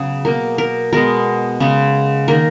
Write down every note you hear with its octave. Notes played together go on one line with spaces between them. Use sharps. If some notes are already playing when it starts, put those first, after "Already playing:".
Already playing: C#3 F#3 B3 G#4
B2 A#3 A#4
A#4
B2 G#3 B3 A#4
C#3 G#3 B3
D#3 A#3 A#4